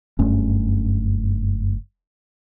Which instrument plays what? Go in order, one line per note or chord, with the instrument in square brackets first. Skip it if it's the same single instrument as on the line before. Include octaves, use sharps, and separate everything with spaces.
[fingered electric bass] F#1 G2 A3 C#4